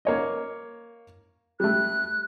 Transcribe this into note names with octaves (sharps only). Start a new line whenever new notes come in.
A#3 C#5 D#5
G3 A3 F#6